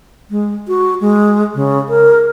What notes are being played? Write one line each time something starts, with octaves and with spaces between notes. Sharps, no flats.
G#3
F#4
G#3
C#3
A#4